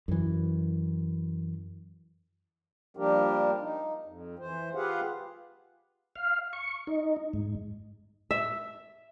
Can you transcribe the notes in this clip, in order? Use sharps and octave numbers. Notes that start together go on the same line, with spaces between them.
F#2 E3
F3 G3 A#3 D4 G4 A#4
D#4
F2
E3 C5
F4 G4 G#4 B4 F5 F#5
F5
C#6
D#4
G#2
E5